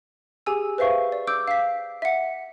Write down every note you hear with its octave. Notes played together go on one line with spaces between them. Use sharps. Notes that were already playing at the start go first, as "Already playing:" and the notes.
G4 G#4 G#5 E6
B4 C5 E5 F5 C#6
D5
D6 E6 G6 D7
F5 B6
E5 F#5